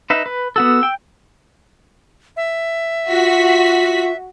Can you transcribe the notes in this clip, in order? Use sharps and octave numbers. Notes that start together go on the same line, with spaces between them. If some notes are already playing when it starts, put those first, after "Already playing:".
D#4 B4 E5
B4
B3 F#4 A4 E6
G5
E5
F4 F#4 B6